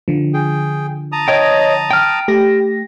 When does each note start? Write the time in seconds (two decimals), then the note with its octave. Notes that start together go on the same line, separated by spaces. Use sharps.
0.08 D3 F3
0.34 G#4 G5
1.12 A5 A#5 D#6
1.28 C#5 D#5 G5
1.91 G5 F6
2.28 A3 G4 A#6